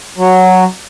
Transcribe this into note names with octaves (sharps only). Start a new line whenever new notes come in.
F#3